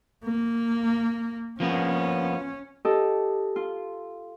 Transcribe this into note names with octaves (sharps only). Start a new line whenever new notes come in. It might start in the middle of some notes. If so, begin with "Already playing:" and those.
A#3
F3 A#3 B3 C#4
G4 A4 D#5
F4